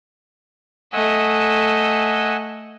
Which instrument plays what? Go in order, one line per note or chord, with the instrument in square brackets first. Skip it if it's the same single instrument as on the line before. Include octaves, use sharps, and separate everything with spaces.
[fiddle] A3 D#5 [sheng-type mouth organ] F#5 G#5 E6